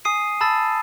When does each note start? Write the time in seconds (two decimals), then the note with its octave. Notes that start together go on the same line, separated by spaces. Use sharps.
0.05 G#5 D#6 C7 D#7
0.41 A5 B5 E6 A6